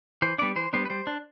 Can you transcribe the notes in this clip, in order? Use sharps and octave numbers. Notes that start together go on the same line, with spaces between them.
E3 C5
G3 B3 D4 D5
E3 C5
G3 B3 D4 C5
B4
G3 C5
D4